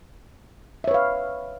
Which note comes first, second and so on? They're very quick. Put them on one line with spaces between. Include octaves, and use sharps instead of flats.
E5 C#5 B4 F5